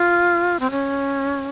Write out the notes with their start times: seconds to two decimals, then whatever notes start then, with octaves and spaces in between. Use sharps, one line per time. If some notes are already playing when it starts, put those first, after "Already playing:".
Already playing: F4
0.60 C4
0.71 C#4